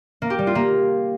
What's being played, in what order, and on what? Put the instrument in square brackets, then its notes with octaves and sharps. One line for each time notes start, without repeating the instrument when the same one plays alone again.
[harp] A#3
G4
G3
F4
A#3